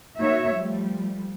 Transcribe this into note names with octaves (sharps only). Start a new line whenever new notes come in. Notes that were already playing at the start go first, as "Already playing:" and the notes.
A#3 D#4 F#4 C#5 E5
F3 G3 A3